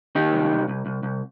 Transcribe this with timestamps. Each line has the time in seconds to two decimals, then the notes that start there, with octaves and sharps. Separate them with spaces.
0.15 D#3 D#4 G4
0.33 C2
0.51 C2
0.68 C2
0.86 C2
1.03 C2